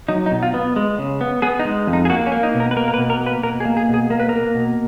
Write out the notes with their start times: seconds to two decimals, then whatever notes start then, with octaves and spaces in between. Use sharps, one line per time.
0.08 F#3 D#4
0.26 D#4
0.31 B2
0.43 F4
0.54 B3
0.76 G#3
0.98 C#3
1.21 B3
1.42 B3 G#4
1.59 D#4
1.65 G#3
1.87 F2
1.93 D#4
2.05 G#4
2.09 A#3 F#4
2.26 C#4
2.32 A#3
2.43 D#4
2.54 B2
2.60 A#4
2.71 B4
2.76 A#3 A#4
2.88 A#4
2.94 B4
2.99 B2
3.10 A#4
3.21 A#3
3.26 B4
3.43 B2 A#4
3.60 G#4
3.65 A#3
3.77 G#4
3.89 B2
3.94 G#4
4.10 A#3 A#4
4.20 B4
4.29 A#3 A#4
4.55 B2